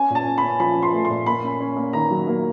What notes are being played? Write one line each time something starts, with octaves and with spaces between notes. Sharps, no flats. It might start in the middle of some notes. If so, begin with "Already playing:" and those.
Already playing: C#4 G#5
A#2
A5
C#4
B5
C#4
F3 B5
F3
C6
A3
C6
A#2
A#3 B5
C#4
C#4
A#3
D#3 A#5
F#3
A#3